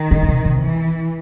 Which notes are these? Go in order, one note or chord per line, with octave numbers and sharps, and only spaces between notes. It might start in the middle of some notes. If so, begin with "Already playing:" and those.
Already playing: D#3
D3
C#3
C3
C3
E3